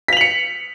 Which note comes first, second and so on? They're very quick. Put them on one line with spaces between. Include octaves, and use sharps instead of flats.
B6 F7 F#7 C#7